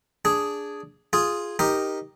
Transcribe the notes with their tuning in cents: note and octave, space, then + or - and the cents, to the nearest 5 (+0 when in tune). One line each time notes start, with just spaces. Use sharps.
D4 -10 G#4 +0
F4 +0 G#4 +0
D#4 -5 G4 +5 A#4 +0